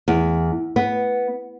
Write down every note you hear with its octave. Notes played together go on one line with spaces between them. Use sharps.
E2
B3